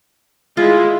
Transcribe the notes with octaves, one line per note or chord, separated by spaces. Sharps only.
G#3 E4 F4